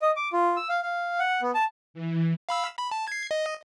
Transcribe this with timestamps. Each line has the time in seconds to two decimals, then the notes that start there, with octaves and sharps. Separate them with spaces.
0.02 D#5
0.16 D6
0.33 F4
0.57 E6
0.69 F5
0.83 F5
1.19 F#5
1.42 B3
1.55 A5
1.94 E3
2.49 F5 B5 E6
2.78 B5
2.91 A5
3.08 G#6 C7
3.31 D#5